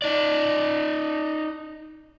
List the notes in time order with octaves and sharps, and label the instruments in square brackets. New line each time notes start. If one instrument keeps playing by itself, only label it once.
[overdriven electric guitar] D#4 D5